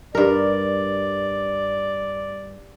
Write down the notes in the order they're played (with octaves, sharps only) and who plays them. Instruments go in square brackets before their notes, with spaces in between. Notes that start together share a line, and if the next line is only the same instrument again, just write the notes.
[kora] G2 A#4 [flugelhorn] D5